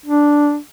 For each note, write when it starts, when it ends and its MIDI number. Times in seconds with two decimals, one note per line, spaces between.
0.06 0.57 62